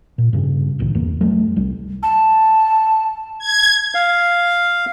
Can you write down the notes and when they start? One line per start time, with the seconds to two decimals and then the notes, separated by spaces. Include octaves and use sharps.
0.18 A#2
0.33 G2 C#3
0.79 D1 C2 A2 D#3
0.95 G1 E2 G2 A#3
1.21 F2 F#3 G3 A3
1.56 C2 G3
2.03 A5
3.39 G#6
3.94 F5